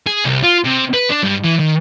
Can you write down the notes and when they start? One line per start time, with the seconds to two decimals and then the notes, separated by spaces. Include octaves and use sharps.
0.07 G#4
0.25 C2
0.43 F4
0.64 C3
0.93 B4
1.10 D4
1.23 G2
1.44 E3
1.59 D#3